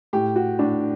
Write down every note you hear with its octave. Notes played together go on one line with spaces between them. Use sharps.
A2 G4
F#4
A2 D4